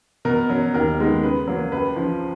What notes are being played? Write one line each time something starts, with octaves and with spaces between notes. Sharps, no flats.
B2 A#4
F#3 C#4
D#2 A#4
D#3 G#3 B3
C#3 B4
F#3 A#3
C#2 B4
C#3 F3